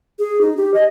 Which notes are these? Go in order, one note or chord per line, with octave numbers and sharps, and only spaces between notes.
G#4
D#4
G4
D#5